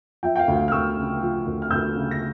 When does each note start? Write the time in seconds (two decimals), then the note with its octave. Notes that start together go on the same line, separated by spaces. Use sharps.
0.23 F3 E5 G5
0.36 G5
0.39 F5
0.48 D2
0.56 F5
0.68 F6
0.72 D2 C#6 E6
0.97 C#3
1.22 F3
1.46 D2
1.62 F6
1.71 D2 E6 G6
1.95 C#3
2.11 A#6